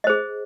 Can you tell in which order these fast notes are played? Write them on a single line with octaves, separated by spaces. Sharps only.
D#5 C5 G#4